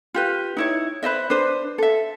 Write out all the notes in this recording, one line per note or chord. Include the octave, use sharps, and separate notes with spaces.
F4 G4 B4
D#4 E4 C#5
B4 C5 D#5 E5
D4 B4 C5
A4 E5